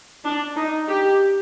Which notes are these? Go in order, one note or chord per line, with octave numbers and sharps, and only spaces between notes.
D4
D#4
G4